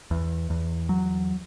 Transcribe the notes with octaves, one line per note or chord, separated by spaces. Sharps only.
E2
E2
F#3